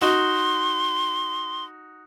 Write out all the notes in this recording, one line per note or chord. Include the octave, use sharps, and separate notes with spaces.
D#4 F#4 C6